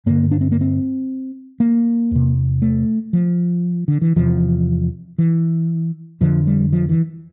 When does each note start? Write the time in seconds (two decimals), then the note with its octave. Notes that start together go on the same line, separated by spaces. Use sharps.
0.06 G2 D3 A#3
0.31 D4
0.41 C4
0.52 A#3
0.61 C4
1.60 A#3
2.11 E2 C3
2.62 A3
3.13 F3
3.88 D3
4.02 E3
4.16 E2 C3 F3
5.18 E3
6.21 F2 D3 F3
6.47 G3
6.72 F3
6.89 E3